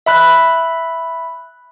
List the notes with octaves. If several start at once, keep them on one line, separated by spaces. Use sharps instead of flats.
E5 B5 F#6